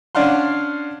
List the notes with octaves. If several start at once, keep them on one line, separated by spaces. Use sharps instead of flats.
C#4 D4 D5 F5 F#5 C6